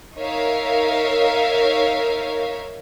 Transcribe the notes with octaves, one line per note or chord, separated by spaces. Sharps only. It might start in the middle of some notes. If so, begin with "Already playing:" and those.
D#4 A#4 C#5 E5 F5